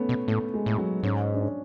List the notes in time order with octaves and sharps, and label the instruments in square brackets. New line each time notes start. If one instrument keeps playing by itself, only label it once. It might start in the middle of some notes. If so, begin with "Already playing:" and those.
Already playing: [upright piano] A3 B3 C#4
[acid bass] B2
[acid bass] A2 [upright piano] A3
[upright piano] G#3
[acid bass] A2
[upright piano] F#3
[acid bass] G#2 [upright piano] C#4
[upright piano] D4
C#4